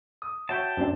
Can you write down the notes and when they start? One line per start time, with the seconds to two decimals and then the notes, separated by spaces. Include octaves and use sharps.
0.22 D#6
0.49 F#4 C#5 E5 G5 A5
0.77 F#2 C4 D4